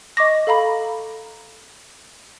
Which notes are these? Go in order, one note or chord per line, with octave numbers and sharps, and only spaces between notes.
D#5 C#6 D6 A#6
A4 F5 A#5 B5